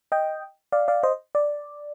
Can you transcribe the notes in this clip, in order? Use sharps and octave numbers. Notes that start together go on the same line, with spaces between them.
D#5 G5
D5 F5
D5 F5
C5 D#5
D5